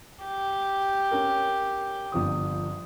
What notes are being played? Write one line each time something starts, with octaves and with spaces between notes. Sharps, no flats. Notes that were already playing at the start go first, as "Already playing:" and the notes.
G4
C#4 A#4
G1 F3 D#6